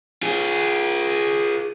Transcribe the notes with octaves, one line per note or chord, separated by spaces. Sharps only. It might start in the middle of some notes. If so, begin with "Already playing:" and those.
F4 G#4